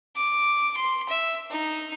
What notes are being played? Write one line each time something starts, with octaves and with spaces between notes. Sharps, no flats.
D6
C6
E5
D#4